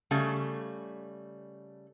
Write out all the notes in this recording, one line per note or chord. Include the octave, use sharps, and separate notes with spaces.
C#3 G3 A3